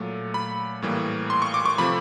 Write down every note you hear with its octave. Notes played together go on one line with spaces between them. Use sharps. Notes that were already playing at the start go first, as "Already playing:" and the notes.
Already playing: A#2 F#3 A3
B5
A2 E3 G3 A#3
C6
C#6
D6
C#6
C3 F3 A3 B5